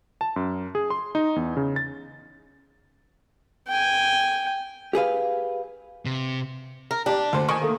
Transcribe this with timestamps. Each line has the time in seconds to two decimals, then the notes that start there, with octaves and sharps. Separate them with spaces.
0.21 A5
0.36 F#2
0.75 G#4
0.90 C6
1.15 D#4
1.36 E2
1.57 C#3
1.76 A6
3.68 G5 G#5
4.93 G4 G#4 B4 F5
6.05 C3
6.91 A#4
7.06 D4 G4 D5
7.33 D2 C5
7.49 D#3 G#5 C#6
7.61 A3 A#3